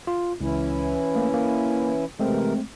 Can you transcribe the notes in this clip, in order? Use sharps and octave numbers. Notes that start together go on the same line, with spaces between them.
F4
C#2 E3 C#4 E4
A3 A#3
A#3
C3 E3 G#3 A3 C4 A#4